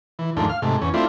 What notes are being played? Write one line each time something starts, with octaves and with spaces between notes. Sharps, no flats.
E3
D#2 G#2 F3 A3 D4
F5 F6
G#2 C3 A3
E2 C#4
A3 C4 D4 E4 F4